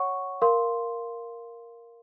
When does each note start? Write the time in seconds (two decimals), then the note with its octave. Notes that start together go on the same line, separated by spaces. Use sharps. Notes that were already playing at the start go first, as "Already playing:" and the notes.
Already playing: C#5 F#5 C#6
0.41 A#4 F5 C6